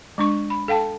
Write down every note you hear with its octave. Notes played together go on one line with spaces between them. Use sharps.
G#3 D4 C#6
B5
A4 F5 G5 A5